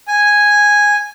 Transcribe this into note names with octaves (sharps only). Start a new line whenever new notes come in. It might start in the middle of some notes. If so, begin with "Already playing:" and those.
G#5